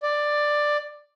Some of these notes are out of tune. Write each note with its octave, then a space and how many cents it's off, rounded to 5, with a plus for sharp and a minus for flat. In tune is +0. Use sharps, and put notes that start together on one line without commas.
D5 +10